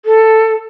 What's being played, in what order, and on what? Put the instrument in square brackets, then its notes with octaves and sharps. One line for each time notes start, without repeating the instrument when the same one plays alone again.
[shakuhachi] A4